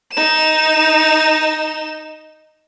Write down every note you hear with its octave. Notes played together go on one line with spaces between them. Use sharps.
D#4 E7